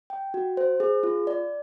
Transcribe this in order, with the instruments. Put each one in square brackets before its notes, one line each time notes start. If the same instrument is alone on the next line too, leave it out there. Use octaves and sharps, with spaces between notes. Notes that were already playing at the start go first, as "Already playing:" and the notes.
[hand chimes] G5
F#4
C5
G#4
F4
D5